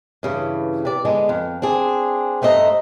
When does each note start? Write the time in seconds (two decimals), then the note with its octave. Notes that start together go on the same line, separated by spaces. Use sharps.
0.23 G2 C#3 E3
0.85 C3 D5
1.05 D3 G#3 B3
1.29 F2
1.62 C4 D4 G#4
2.42 G2 A3 C5 D#5 E5 A#5